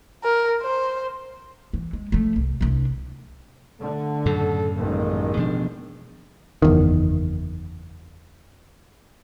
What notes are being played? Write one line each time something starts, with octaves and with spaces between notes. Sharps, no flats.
A#4
C5
E3
G#3
F3 A3
C2
C2 D4
D3 A3
F#2 A2 C#3 A4
A1 D#3 G#3 A#3
B2 F3 D4
F#1 E2 D#3